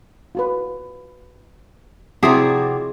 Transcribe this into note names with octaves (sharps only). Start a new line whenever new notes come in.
F4 F#4 B4
C3 F3 C4 E4 F#4 G#4 D5 E5